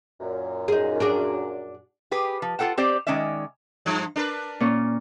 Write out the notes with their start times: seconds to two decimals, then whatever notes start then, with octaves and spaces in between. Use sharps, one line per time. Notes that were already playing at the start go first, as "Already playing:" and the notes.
0.20 F#2 A#2
0.68 D#4 G#4
1.00 D4 F#4 G#4
2.11 G4 G#4 B4
2.42 F3
2.59 F4 F#4 A4 F#5 G5
2.77 C4 G4 C5 D5
3.07 D#3 G#3 C#4 D5 E5
3.86 G2 F3
4.16 D4 A#4 B4
4.60 A#2 C#4 C#6